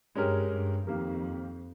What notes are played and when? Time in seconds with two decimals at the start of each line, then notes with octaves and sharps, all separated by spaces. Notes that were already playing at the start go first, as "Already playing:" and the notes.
0.15 G2 G#3 C#4 G4 A#4
0.52 G2
0.87 F2 D#3 A#3 D#4 G4 A#4